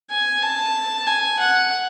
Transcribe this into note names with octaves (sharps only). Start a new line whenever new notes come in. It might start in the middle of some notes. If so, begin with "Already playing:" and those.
G#5
A5
G#5
F#5